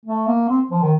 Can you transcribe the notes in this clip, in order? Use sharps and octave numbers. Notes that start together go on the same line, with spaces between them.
A3
A#3
C4
F3
D#3